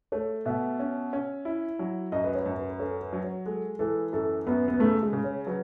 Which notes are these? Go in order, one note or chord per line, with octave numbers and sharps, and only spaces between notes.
A3 C#5
B2 E5
C#4
C#4
E4
F#3
F#2 D#5
B4
C#5
F#2
B4
B4
C#4 A4
B4
F#3
C#5
G#3 A4
E3 A4
F#2 A4
F#2 B3
B3
C#3 A3
G#3
C#3
C#4
F#3 B4